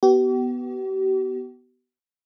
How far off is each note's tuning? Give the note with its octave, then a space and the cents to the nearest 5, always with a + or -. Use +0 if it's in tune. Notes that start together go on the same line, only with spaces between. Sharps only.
B3 +0 G4 -45